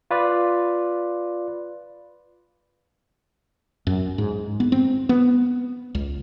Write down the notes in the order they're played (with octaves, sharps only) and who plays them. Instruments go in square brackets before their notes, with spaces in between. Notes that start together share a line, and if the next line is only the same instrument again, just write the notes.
[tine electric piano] F4 B4 D5
[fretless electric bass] F#2
G#2
B3
C4
B3
C#2